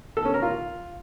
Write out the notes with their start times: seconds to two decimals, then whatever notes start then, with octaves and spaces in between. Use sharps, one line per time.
0.17 A4
0.25 C#4
0.34 A#4
0.42 F4